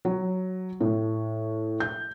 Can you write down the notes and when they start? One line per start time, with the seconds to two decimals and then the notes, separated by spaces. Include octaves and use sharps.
0.05 F#3
0.81 A2
1.80 G6